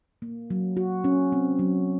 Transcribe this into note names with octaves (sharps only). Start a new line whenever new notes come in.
A#3
F#3
F#4
C#4
C4
F#3